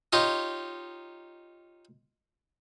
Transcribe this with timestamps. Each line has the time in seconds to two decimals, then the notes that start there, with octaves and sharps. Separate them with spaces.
0.13 D#4 F4 G4 C#5 D#5